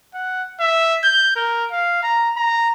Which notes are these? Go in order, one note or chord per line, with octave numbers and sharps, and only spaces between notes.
F#5
E5
G6
A#4
F5
A#5
A#5